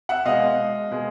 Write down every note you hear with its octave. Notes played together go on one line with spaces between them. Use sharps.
E5 F#5
B2 G#3 D#5 F5
B2 G#3